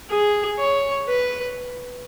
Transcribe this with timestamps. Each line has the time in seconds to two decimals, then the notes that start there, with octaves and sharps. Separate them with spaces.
0.10 G#4
0.59 C#5
1.08 B4